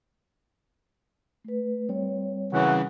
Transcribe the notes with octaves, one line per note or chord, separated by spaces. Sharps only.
A3 B4
G3 C4 C#5
F#2 C#3 E3 F#4